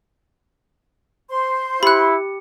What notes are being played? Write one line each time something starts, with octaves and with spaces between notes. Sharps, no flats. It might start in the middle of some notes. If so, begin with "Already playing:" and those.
C5 C6
E4 G4 B5 F#6 C#7